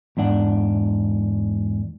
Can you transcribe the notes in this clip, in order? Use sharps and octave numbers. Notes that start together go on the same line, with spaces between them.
E2 G#2 D4 F#5